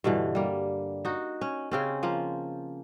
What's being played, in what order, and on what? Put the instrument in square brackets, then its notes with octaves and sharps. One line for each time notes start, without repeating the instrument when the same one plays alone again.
[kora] G2 B2 D3 E3
G3 A#3
D#4 F#4
C#4
C#3 C4 C#4
F3 A#3